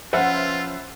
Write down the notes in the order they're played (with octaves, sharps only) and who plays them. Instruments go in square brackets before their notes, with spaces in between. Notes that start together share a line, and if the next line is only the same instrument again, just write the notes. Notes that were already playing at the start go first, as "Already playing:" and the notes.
[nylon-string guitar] F3 C#4 [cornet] F4 [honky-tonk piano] B4 C5 E5 [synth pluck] F#5